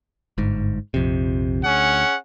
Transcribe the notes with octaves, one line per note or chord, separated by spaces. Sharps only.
G1 G#2
A#1 F2 C3
D2 C#4 G#4 F#5